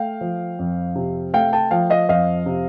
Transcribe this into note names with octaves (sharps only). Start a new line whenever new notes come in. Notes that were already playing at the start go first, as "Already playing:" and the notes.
Already playing: A3 F5 G5
F3
F2
C3
A3 F5 G5
G5 A5
F3 F5 G5
D#5 F5
F2 D#5 F5
C3